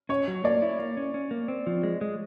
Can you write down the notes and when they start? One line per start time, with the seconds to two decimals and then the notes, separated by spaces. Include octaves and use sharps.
0.09 C#4 C#5
0.28 F#3
0.44 A#3 D5
0.62 E4
0.79 A#3
0.97 C#4
1.14 C#4
1.31 A#3
1.48 C4
1.67 F3
1.83 G#3
2.01 G#3